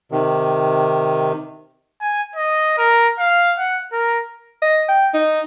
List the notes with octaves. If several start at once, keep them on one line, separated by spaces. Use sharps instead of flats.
C3 D#3
G#5
D#5
A#4
F5
F#5
A#4
D#5
G5
D#4